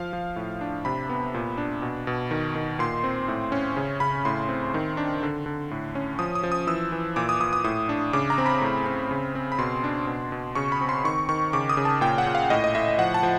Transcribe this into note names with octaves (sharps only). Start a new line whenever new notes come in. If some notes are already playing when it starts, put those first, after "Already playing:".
Already playing: F3 F5
F3
A2
D4
C3 B5
B3
A#2
D4
B2
B2
D#3
D#3
A#2 C6
C4
A2
C#4
C#3
C#3 B5
A2 C6
C4
D#3
D4
D3
D3
A2
C#4
F3 D#6
D#6
F3
D#6
E3 E6
E3
A#2 D6
D#6
A#2 D#6
D#6
A2 D#6
D4
C#3 D6
A#5
C4
B5
A2
C4
C#3
C4
B5
B2 C6
D4
B2
B2
C#3 C#6
B5
C4
C6
D#3 C#6
D#3 C#6
C#3 D6
D#6
C#3
A5
A#2 G5
F#5
A#2
F5
A2 D#5
D#5
A2 E5
F3 F#5
A5
F3